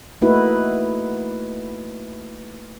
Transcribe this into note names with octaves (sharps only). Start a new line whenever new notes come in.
A3 A#3 D#4 E4 F#4 B4